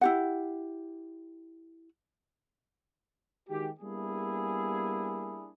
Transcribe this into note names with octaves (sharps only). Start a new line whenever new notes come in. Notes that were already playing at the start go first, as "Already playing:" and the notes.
E4 G4 F#5
D#3 G#3 F#4 G4
G3 A#3 B3 D4 E4 G#4